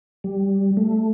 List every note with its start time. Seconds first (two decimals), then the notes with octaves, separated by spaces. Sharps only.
0.24 G3
0.77 A3